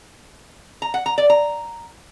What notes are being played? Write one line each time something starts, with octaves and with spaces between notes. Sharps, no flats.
A#5
F#5
A#5
D5
A#5